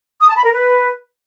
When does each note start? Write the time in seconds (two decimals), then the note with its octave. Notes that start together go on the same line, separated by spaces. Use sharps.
0.21 D#6
0.29 A5
0.37 B5
0.45 A#4
0.53 B4